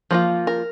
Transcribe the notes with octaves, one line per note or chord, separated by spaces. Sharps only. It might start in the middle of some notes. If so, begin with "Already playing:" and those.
F3 A#3 F4
A#4